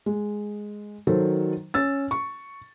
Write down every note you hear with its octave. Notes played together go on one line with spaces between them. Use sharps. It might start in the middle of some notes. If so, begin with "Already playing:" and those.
G#3
D#3 F#3 A4 C5
C#4 E6 A6
C#6